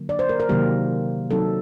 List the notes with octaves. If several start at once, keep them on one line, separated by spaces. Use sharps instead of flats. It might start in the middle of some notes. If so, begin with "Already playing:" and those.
Already playing: D3 F#3 A#3
D5
C5
A#4
A#4
C3 D#3 F#3 A#3 G4
F#3 C4 D#4 A4